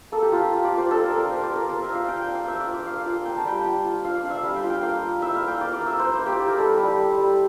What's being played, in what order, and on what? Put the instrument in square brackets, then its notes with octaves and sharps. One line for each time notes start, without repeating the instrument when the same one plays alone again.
[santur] A#3 A4
G4
A#3 F4
G4
F4
D5
A#3
C5
D4 A4
A#4
D4
A#4
A#3 C5
D5
F4
A#4
A#3 A#4
E5
A#3
F5
F4 G5
G5
D4
F5
A#3 E5
D5
F4
D5
A#3 F5
F5
F4
G5
A#3 G5
A5
G3 G5
F4
F4
D4 F5
D5
D4 F5
E5
G3 F5
G5
F4
G5
A#3 F5
A#3
E4 E5
F5
A#3
G5
A#3 D5
D5
A#3
E5
A#3 C5
A#3
G4
E4
A#4
G3 A4
G3 G4
G3
G3